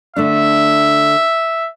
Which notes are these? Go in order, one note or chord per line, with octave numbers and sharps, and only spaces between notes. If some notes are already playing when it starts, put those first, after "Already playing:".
D3 A3 D4 E5